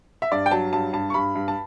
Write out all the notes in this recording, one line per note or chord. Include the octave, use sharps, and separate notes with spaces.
E5
G2 D5
G5
F#3 A5
G2 A5
G2 A5
C#6
G2 B5
G2
A5